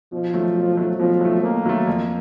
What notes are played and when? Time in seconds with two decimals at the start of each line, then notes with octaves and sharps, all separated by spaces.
0.12 B2 F3
0.34 F#3 A3
0.56 B2
0.77 F#3 A3
1.00 B2 F3
1.21 F#3 A3
1.43 B2 A#3
1.66 F#3 A3
1.87 F2